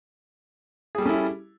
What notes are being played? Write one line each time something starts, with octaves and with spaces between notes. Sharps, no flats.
G3 C#4 E4 G#4 A4